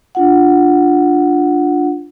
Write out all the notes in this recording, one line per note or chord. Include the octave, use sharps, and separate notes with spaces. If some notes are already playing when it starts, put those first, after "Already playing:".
D4 F4 F#5